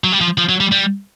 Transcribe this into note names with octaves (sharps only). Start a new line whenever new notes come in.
F#3
G3
F3
F3
F#3
G3
G3